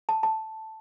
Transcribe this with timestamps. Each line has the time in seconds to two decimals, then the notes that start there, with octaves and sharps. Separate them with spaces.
0.09 A5
0.23 A5